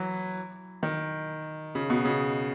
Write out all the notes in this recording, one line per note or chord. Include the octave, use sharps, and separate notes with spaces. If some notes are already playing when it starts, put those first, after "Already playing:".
Already playing: E3 F#3
D#3
C#3
B2
C#3